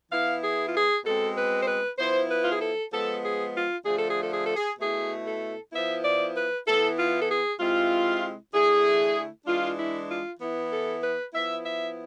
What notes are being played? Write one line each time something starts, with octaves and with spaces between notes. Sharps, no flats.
E3 B3 E4 F5
G#4
F4
G#4
B2 G#3 C4 A4
B4
C5
B4
F3 B3 E4 C5
B4
F4
G#4
A4
F3 G#3 B3 A4
G#4
F4
D3 F3 A3 G#4
A4
G#4
A4
G#4
A4
G#4
B2 A3 E4 G#4
A4
F3 B3 E4 E5
D5
B4
E3 B3 E4 A4
F4
A4
G#4
C3 G#3 C4 E4 F4
D3 A3 E4 G#4
E3 G#3 D4 F4
E4
F4
E3 B3 E4
A4
B4
F3 B3 E4 E5
E5